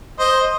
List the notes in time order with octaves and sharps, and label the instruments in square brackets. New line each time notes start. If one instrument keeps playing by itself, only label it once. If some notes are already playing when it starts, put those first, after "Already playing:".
[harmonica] C5 D#5